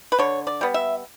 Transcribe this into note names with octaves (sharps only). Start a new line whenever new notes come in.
B4
D3 C#5
D5
G3 B3
E5